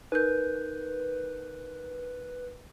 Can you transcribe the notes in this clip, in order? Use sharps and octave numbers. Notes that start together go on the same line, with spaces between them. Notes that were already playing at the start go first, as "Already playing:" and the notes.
D#4 A#4 B4 G6